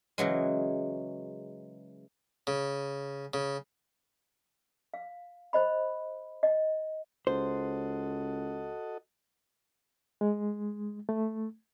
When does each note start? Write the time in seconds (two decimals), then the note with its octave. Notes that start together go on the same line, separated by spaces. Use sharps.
0.18 C#3 E3 F#3 G#3
2.47 C#3
3.34 C#3
4.94 F5
5.53 C5 D#5 B5
6.43 D#5
7.27 C#2 F#4 A4 C5 D#5
10.21 G#3
11.09 A3